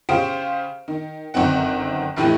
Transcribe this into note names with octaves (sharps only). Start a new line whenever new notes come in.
C#3 C#4 G4 C5 F5 D7
D#3
G1 F#2 D#3 C4 F#5
F1 A2 E3 A3 G4 D#7